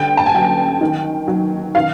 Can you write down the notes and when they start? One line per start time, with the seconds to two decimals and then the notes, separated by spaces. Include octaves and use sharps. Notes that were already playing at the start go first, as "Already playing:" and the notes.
Already playing: D3 G3 G5
0.17 A5
0.26 G#5
0.34 F#3 G5
0.81 D#3
1.28 F#3
1.75 D#3 F5